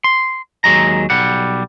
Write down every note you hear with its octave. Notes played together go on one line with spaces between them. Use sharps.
C6
D#2 F#3 G#3 A#5
B1 G3 F#5